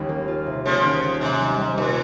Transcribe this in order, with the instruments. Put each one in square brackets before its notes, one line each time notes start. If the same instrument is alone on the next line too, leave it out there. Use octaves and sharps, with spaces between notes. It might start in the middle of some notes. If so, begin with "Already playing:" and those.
Already playing: [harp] D#2 G3 [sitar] C#3
[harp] A#3
F4
C3
[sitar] C#3 F3 [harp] A#3
[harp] D#3
D#3
[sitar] G#2 [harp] C3
[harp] G3
G3
[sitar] A#2 [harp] D#4